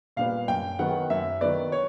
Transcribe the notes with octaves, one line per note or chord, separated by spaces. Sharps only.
A#2 G3 B3 F5
F#2 G5
D#3 F#3 B3 F#5
F#2 E5
D#3 F#3 B3 D5
C#5